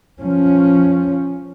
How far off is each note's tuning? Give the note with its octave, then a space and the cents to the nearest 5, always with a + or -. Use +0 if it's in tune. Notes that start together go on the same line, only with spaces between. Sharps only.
F3 +0 C#4 +0